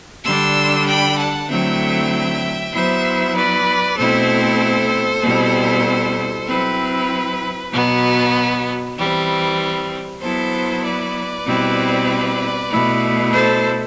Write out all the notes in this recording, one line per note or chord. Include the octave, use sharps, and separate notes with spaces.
D3 G3 D4 C6 E6
G5 B5
F#5 A5
D3 F#3 A3 C4 E4 E5 G5
F#3 B3 E4 C5 E5
B4 D5
B2 A3 C4 E4 A4 C5
B2 G3 C4 E4
F#3 C4 E4 B4
B2 F#3 B3
E3 G3 C4
F#3 B3 E4 A4 C5
B4 D5
B2 G3 C4 E4
B2 A3 E4
A4 C5